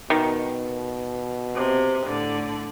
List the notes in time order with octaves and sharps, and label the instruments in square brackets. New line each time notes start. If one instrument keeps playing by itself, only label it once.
[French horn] B2 [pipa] D#3
[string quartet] C3
A2 D3 D5